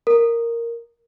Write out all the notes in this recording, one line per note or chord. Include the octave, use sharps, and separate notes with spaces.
A#4